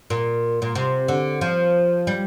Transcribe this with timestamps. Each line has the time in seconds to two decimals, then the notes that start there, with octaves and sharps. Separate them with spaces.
0.10 A#2
0.62 A#2
0.75 C3
1.08 D3
1.41 F3
2.07 G3